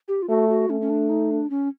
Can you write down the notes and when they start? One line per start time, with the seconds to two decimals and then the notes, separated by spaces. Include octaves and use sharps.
0.08 G4
0.22 F4
0.29 A3 F#4
0.49 F#4
0.69 A3 C#4
0.81 C#4
0.90 D4
1.09 D#4
1.31 D4
1.50 C#4